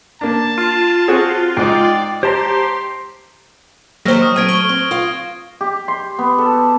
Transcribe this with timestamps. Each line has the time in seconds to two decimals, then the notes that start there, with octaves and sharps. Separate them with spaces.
0.21 A#3 D4 A5
0.58 F4
1.08 C4 F#4 G#4
1.57 G#2 D#4 D5 G5
2.23 G4 C5 A5 A#5 C6
4.05 D#3 F#3 A#3 G4 C5 F6 A#6
4.21 C#6 D#6 F6
4.36 A3 C4 F6 G#6 D7 D#7
4.49 C#6 G7
4.69 C4
4.91 F4 F5
5.61 G4
5.88 C6
6.19 B3
6.38 A4